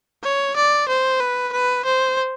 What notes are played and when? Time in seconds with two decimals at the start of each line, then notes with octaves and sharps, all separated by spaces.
0.23 C#5
0.56 D5
0.88 C5
1.20 B4
1.53 B4
1.85 C5